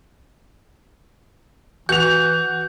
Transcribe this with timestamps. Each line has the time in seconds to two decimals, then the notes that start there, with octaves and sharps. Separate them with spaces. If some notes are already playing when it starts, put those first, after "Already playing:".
1.89 E3 F#4 G6 F7